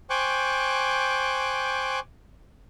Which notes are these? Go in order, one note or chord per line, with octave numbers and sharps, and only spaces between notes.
C5 G5 G#5 C#6 D6 F#6